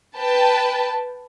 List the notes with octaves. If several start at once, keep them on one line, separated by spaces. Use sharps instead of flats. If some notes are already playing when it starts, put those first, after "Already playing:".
B4 G5 A5